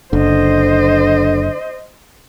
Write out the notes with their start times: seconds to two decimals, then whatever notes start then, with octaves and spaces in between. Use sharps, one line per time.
0.13 F#1 D3 C5 D#5